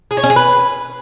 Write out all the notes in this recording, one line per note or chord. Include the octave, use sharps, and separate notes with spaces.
G#4
C#5
C#4
G#4
B4